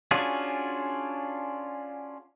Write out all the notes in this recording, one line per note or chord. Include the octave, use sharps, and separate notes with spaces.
C#4 D4 F4 F#4 G#4